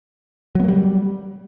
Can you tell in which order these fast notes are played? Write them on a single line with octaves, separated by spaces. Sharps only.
F#3 B3 A#3 G3